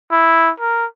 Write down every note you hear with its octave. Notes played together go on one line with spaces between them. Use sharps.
E4
A#4